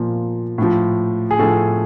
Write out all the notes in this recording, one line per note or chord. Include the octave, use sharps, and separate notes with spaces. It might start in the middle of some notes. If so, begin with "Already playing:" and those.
Already playing: A#2 F3
A2 F3
G#4
A2 F3 A4